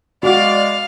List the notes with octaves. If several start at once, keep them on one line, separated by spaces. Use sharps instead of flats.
G#3 F#4 D5 F5